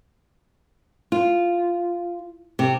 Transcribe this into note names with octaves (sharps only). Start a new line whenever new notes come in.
F4
C3